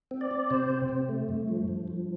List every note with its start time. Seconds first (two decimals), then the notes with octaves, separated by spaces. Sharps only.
0.11 C4
0.21 D5
0.31 C4
0.50 C3 C5
0.70 C4
0.89 C3
1.09 A3
1.29 G2
1.48 F3
1.68 G2
1.88 F3